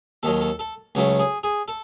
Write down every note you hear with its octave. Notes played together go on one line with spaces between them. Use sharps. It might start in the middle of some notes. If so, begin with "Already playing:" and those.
D#2 D#3 F#3 A4
A4
A4
C#2 C#3 F#3 A3 F#4
G#4
G#4
A4